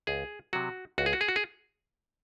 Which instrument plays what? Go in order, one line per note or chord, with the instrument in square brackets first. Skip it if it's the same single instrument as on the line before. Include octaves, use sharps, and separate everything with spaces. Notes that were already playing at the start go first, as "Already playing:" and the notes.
[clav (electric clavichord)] C#2 G#4
C3 F#3 F#4
C#2 F#4
G#4
F#4
G#4
F#4
G#4